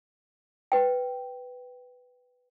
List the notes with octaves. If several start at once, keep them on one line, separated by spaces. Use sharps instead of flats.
B4 G5